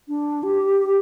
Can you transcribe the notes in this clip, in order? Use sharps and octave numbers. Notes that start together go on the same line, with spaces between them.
D4
G4